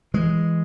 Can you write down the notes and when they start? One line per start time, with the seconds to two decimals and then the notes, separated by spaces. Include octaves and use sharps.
0.14 E3 G#3